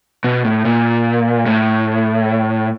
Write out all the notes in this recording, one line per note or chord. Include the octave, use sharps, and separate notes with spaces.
B2
A2
A#2
A2